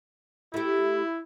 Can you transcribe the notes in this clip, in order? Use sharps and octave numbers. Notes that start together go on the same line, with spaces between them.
A3 E4 G4